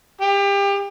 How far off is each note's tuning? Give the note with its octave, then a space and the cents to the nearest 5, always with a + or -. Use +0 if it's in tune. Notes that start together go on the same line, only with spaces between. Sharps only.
G4 +30